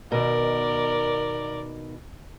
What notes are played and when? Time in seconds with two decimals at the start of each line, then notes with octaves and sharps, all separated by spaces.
0.12 B2 D#3 A#4 D5